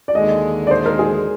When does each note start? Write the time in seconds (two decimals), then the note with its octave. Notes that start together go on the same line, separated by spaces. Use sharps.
0.08 D5
0.15 D#2 D3 G#3 D#5
0.67 D5
0.71 C5
0.86 A#4
0.99 G#4